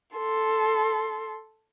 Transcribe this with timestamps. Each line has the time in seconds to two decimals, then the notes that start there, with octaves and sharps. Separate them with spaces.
0.16 A4 C6